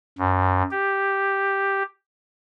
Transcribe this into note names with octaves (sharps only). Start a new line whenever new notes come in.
F#2
G4